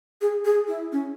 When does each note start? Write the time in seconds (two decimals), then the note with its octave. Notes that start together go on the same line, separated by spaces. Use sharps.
0.21 G#4
0.45 G#4
0.68 E4
0.92 C#4